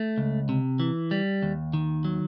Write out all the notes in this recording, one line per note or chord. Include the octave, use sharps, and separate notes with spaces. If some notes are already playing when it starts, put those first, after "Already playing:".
Already playing: A3
C#2
C3
E3
G3
D#2
D#3
F#3